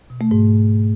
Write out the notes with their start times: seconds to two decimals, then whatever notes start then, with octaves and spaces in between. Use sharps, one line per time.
0.10 B2
0.21 A3
0.31 G#2